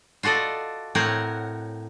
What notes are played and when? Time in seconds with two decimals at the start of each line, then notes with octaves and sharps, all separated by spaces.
0.23 F4 F#4 A4 D5 D#5
0.95 A2 C4 A#4 C#5 F#5